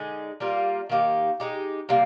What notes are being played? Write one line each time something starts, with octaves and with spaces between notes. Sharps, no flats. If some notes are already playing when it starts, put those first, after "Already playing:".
Already playing: D3 G#3 D#4 G#4
G3 A#3 F4
D#3 A#3 D#4 G4
G#3 D#4 G4
C3 G3 A#3